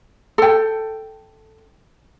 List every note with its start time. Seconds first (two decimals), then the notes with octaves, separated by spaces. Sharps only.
0.38 A4 G5